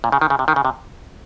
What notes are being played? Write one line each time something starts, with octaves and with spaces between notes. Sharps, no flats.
A#2
C#3
D#3
C#3
C3
D#3
C#3
C3